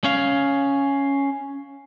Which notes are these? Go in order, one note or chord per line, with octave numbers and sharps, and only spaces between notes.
C#4 F5